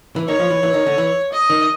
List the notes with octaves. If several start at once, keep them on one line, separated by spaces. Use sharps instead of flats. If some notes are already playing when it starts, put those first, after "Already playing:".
E3
D#3 C#5
F3
E3
E3
D#3
D3
E3
D#5
D#3